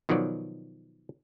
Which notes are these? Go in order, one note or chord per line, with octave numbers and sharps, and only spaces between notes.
B2 D#3 F3 F#3 D5